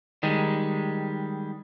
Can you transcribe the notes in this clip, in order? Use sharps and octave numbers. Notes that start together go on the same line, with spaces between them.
D#3 G3 G#3